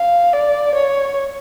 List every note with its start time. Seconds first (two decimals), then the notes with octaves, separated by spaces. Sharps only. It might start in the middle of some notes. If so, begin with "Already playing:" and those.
Already playing: F5
0.33 D5
0.74 C#5